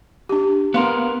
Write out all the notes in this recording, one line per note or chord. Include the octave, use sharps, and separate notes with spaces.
D4 G4
B3 A#4 F5 C6